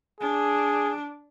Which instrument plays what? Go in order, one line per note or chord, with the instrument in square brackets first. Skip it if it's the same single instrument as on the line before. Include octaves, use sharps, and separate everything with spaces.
[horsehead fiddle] D4 [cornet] G#4